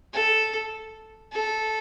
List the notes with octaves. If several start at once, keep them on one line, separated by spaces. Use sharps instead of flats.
A4
A4